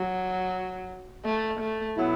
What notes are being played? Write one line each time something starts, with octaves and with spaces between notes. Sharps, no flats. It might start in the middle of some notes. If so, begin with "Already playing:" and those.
Already playing: F#3
A3
A3
B2 F#3 B3 E4